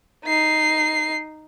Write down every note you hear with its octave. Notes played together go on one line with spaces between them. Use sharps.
D#4 C7